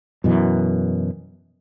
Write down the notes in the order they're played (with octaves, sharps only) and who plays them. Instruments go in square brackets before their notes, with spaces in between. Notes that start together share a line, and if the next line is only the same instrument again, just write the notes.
[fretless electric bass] F#2 B2 E3